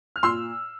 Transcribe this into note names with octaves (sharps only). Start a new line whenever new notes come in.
F6
A#2 C6 E6